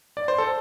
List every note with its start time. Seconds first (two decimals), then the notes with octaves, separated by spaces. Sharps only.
0.17 D5
0.28 C5
0.38 A4